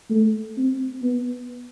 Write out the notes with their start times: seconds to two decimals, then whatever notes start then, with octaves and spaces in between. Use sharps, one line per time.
0.10 A3
0.57 C4
1.02 B3